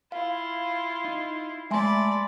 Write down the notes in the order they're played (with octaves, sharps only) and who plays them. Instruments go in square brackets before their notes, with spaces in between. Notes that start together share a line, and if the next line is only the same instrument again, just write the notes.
[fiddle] E4 F4 [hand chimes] F5
[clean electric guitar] D#4
[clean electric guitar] G#3 A3 A5 [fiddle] D5 B5 [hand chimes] E5 G#5 C6